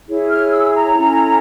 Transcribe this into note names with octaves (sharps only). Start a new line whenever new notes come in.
E4 G#4 C#5
F6
E6
A#5
C#4 E4 A4